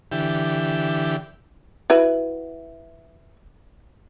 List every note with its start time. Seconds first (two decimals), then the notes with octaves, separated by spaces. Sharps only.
0.12 D3 E3 G4
1.90 E4 F#4 B4